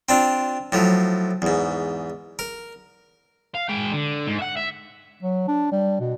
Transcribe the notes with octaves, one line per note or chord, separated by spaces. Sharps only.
C4 D4 F4
A2 F3 F#3
E2 G#2
A#4
F5
G#3 G5
D3
G#2
E5 F#5
E5
F#3
D4
G3
B2